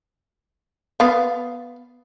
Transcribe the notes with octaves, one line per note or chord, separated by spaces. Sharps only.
B3 F5